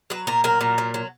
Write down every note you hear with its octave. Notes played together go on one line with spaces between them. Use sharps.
F#3 B4
A#2 A#4
F#3 A#4
A#2
F#3
F#3